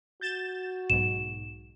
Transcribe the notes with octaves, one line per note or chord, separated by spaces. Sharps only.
F#4 G6 A6 E7
B1 G#2 E7